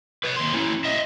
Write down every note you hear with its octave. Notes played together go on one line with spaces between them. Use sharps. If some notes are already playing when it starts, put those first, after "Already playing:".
B4 C#5
D#2 C6
C#4 E4
D#5 E5